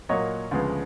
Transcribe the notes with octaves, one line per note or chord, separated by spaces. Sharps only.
A#2 F#3 A#3 C#5 D#5
D2 C#3 F3 G#3 B3